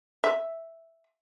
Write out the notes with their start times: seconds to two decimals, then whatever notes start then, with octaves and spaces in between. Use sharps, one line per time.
0.24 E5